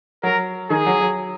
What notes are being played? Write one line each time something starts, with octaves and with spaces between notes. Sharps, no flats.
F#3 A#4
D#3 G#4
F#3
F#3